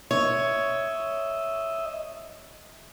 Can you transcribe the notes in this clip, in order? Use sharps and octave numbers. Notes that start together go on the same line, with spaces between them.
C#5 D#5 E5